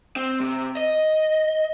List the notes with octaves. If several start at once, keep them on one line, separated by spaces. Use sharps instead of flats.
C4
C3
D#5